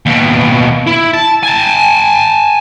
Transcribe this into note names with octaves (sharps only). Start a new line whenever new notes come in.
D#2 B2
E4
A5
G#5 A5